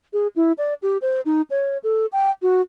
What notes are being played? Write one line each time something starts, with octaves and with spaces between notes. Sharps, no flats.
G#4
E4
D5
G4
C5
D#4
C#5
A4
G5
F#4